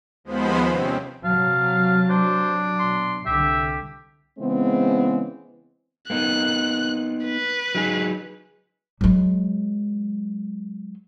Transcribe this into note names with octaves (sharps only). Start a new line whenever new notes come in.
D#2 F3 G#3 B3 C5 B5
C3 C4 C#4
C3 F#3 F5 A5
D4 C5
B2 C6
C2 D3 G4 E5
C#3 E3 G#3 B3 C4
A#3 B3 D#4 F#6
B4
F#3 D#4 G#4
F#3 G#3